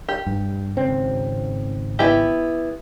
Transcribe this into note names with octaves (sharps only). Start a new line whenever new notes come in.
G4
G2
G#1 C#3 C4
B3 E4 G4